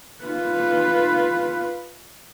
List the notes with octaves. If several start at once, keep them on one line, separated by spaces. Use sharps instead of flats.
F4 B4